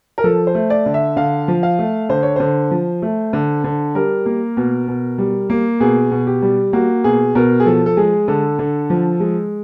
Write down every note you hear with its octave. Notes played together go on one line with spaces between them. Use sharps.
A#4
F3 A4
C5
A3
D5
D3
E5
D3 F5
F3
F5
A3
D3 C5
C#5
D3 C5
F3
A3
D3
D3
G3 A#4
A#3
B2
B2
G3
A#3
B2 G#4
B2
G4
G3
A#3 F#4
B2 G#4
B2 A#4
G#4
F3 A4
A4
G#3 G#4
D3 A4
D3
F3
G#3